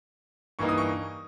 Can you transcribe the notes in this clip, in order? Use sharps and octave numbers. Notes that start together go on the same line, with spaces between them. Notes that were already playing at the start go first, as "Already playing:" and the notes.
G2 E3 A#3 D#4 C#6
D#6
C#6